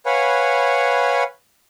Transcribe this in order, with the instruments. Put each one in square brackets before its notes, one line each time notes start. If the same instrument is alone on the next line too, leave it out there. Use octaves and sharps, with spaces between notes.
[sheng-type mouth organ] B4 C#5 F5 F#5 G#5 B5